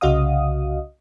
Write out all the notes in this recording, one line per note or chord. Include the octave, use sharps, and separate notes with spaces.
C2 C#3 F#4 D#5 F5 D#6